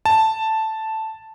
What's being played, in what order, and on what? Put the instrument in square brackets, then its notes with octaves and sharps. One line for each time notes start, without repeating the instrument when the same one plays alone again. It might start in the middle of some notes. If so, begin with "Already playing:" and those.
[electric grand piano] A5